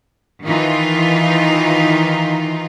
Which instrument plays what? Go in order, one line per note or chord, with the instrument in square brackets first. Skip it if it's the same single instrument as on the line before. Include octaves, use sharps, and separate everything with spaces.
[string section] D#3 E3 D#4 F4